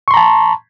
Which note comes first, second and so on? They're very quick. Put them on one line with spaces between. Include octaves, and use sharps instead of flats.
C#6 C6 A#5 A5